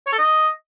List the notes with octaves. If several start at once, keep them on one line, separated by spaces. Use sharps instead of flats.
C#5
A4
D#5